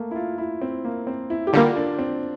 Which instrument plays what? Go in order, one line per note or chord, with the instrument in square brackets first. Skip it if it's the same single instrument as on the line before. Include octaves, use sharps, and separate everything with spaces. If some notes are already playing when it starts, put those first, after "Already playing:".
Already playing: [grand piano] A3 A#3
E4
F4
E4
C4
A#3
C4
E4
G4
[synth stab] D3 G3 A#3 [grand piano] F4
[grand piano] D4
C4